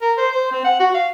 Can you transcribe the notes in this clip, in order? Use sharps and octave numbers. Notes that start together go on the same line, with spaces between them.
A#4
C5
C5
C4
F#5
F#4
F5